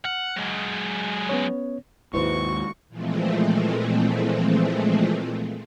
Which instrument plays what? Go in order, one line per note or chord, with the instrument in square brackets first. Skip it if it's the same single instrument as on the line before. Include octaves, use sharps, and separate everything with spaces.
[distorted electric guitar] F#5 [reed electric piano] F6
[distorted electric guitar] F#3 G#3
[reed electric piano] B3 C#4 C#5
[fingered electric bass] D#2 G#2 [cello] G#3 F#4 [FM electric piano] E4 B4 C5 [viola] C#6
[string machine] A#2 E3 F3 G#3 A3 C4